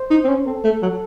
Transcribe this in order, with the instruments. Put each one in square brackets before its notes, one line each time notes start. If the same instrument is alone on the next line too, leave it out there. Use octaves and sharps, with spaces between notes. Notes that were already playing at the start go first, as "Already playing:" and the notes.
Already playing: [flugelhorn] C5
[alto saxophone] D#4
C4
C#4
[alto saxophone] C4 [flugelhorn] A4
[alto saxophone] A3
F#3